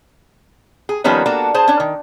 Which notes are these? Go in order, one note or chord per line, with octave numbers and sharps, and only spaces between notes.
G#4
D#3 F3 G3 A#3 B3 C#4
A#3 D4 F#4 A4
G#4 C5 A5
C#4 D4
D#3